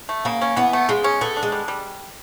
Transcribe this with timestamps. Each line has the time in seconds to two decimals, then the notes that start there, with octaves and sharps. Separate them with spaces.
0.09 A3
0.25 C#3 A#3
0.41 C#4
0.56 E3 B3
0.73 A3
0.89 C#3 G#3
1.04 C#4
1.21 A3 B3
1.37 D4
1.43 G#3
1.52 G3
1.68 G3